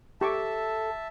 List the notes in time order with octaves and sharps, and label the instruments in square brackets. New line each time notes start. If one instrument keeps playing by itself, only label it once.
[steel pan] G4 C#6 D6 [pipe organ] A4 [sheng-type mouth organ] E5 A5